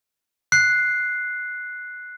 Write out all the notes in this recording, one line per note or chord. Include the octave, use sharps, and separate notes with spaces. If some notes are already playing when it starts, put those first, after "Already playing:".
F#6 C7